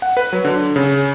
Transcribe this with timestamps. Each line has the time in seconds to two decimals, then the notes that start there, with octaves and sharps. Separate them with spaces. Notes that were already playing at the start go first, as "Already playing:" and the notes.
0.02 F#5
0.17 B4
0.33 F#3
0.45 D3
0.76 C#3